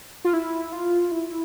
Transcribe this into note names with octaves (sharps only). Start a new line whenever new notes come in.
F4
E4
F4
E4